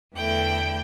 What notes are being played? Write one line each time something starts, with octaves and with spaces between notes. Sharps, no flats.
E2 D3 A3 E4 G5